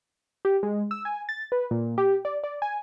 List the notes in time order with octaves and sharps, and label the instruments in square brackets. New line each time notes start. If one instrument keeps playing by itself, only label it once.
[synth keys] G4
G#3
E6
G#5
A6
B4
A#2
G4
D5
D5
G#5